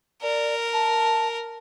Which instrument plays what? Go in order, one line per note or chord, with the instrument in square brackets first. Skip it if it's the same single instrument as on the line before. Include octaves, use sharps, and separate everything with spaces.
[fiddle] A#4 [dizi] D5
[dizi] A5